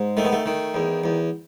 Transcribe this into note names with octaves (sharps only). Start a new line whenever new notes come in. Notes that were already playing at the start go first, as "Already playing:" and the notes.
Already playing: G#2
D#3 A3
B3
A3
D#3
E2
E2